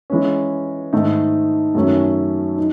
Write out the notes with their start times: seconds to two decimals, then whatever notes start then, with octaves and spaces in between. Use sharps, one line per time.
0.10 E3 G#3 C#4
0.93 G#2 D#3 A3 D#4
1.75 F#2 D#3 A3 C#4
2.58 D#4